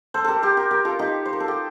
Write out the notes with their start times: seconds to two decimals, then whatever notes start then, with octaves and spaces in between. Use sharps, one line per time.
0.14 A4 C5
0.24 G4 A4 A#4
0.42 G4 A#4
0.57 G4 A#4
0.71 G4 A#4
0.85 F4 A4
0.99 D#4 G4
1.26 C5
1.33 A#4
1.40 A4
1.48 G4